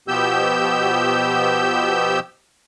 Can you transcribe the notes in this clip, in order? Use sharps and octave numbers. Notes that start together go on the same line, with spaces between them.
B2 F3 B3 G4 E6 G6